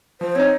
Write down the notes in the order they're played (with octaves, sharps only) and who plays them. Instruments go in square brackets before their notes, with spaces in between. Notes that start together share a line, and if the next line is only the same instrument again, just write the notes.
[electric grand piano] F3 [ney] C5
[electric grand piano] C4 D#4 [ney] C#5